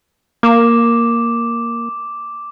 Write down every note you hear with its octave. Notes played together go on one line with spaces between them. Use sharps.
A#3 D6 E7